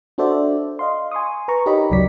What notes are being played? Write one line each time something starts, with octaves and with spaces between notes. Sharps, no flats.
D4 F#4 A4 C5 D5 E5
D#5 F5 C6
G#5 C6 C#6 D#6
B4 A#5 C#6
D#4 G4 A#4 C#5 D#5 B5
A1 D2 C#3 F#3 D5 B6